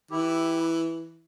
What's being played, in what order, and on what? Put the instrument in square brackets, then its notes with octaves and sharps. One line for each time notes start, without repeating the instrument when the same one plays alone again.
[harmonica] E3 [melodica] E4 G4